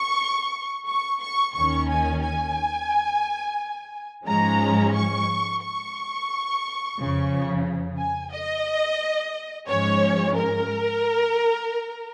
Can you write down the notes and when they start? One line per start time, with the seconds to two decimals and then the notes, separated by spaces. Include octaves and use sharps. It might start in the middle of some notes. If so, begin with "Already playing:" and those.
Already playing: C#6
0.87 C#6
1.21 C#6
1.54 D#2 D#3 C#4 C#6
1.89 G#5
2.22 G#5
4.26 G#2 F3 G#3 C#4 A#5
4.93 C#6
5.62 C#6
6.97 F2 C#3 F3
7.98 G#5
8.33 D#5
9.68 G#2 F3 G#3 C#4 C#5
10.36 A#4